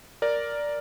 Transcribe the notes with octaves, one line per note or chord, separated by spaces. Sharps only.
A#4 D5